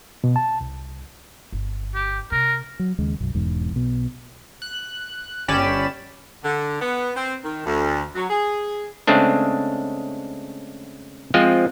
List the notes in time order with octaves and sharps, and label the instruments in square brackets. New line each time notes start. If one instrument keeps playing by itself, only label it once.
[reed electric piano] B2
A5
C2
[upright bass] G1
[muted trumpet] G4
[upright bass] C3 [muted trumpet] A#4
[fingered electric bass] F#3
D#2 C#3 G#3
B1 F#2
E1 E2 G#2
B1 B2
[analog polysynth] F#6
G1 C#4 G4 D5 B5 E7
[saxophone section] D3
B3
C4
D#3
D2
F#3
G#4
[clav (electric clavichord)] C#3 G#3 A3 C4 D4
F3 G#3 C4 F4